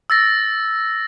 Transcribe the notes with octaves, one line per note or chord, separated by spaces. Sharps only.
E6 A6 A#6